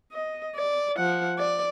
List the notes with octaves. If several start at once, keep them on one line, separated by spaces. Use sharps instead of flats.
D#5
D5
F3 F#5
D5